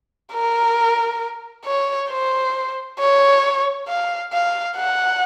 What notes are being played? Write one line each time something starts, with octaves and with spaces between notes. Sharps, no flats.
A#4
C#5
C5
C#5
F5
F5
F#5